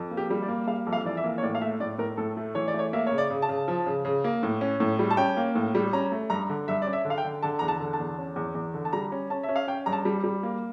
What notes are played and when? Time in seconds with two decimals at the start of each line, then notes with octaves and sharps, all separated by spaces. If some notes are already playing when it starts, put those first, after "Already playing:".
Already playing: F2
0.11 A#3
0.17 G4
0.30 G3
0.43 D5
0.48 A#3
0.67 G3 F5
0.87 F2
0.93 F5
1.05 E3 D5
1.17 E5
1.24 A#3
1.38 C#5
1.43 A2 D5
1.55 F5
1.61 A3 E5
1.80 A2 D5
1.98 A2 A#4
2.17 A2 A4
2.37 A3
2.55 E3 C#5
2.68 D5
2.74 A3 C#5
2.93 A#3 E5
3.07 C#3 C#5
3.18 D5
3.30 C#3
3.42 A5
3.49 C#3
3.68 F3
3.86 C#3
4.05 C#3
4.24 A#3
4.43 A2
4.61 C#4
4.80 A2
4.99 G3
5.11 A5
5.17 C#4 G5
5.37 A#3
5.55 A2
5.75 G3
5.93 C#4 A#5
6.12 A3
6.30 G2 A#5
6.49 D3
6.68 G2 E5
6.82 C#4 D5
6.93 E5
7.05 D3
7.10 F5
7.18 G5
7.24 D3
7.43 D3 A5
7.59 E2 A#5
7.68 A5
7.80 D3
7.93 A5
8.00 E2
8.18 C#4
8.36 E2
8.55 E2
8.74 D3
8.85 A5
8.93 G3 A#5
9.12 C#4
9.30 C#4 A5
9.43 E5
9.49 C#4
9.56 F5
9.67 C#4 G5
9.86 G2 A#5
9.93 A5
10.05 G3
10.24 G3
10.43 A#3